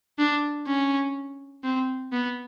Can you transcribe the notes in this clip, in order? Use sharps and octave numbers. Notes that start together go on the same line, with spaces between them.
D4
C#4
C4
B3